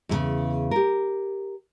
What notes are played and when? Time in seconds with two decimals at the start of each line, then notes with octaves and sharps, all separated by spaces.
0.09 E2 A2 C#3
0.71 G4 A#4